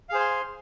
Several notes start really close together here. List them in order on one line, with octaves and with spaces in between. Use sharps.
F5 G#4 C5 G#5 C6